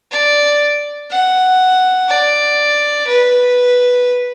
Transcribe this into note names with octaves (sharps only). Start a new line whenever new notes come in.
D5
F#5
D5
B4